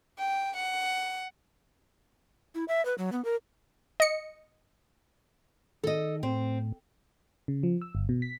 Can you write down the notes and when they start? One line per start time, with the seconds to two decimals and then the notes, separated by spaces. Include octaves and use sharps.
0.19 G5
0.56 F#5
2.55 E4
2.68 E5
2.85 B4
2.98 F#3
3.12 B3
3.25 A#4
4.00 D#5 C#7
5.84 D#3 A4 D#5
6.23 A2 C4
7.48 C#3
7.63 F3
7.82 E6
7.95 G1
8.09 B2
8.22 B6